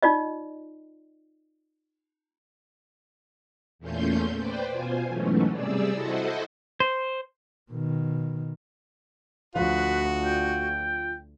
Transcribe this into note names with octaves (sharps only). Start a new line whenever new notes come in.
D#4 F4 D5 D#5
E2 A#2 A3 C#4 C6 G6
B4 C5 D5 G5
B2 F4 C5 G#5
G#2 B2 E3 F#3 A3 C#4
C3 G3 G#4 D5 E6
E4 F#4 A4 C5 D#5
C5
B2 D#3
D2 F3 F4 F#4 B4
G5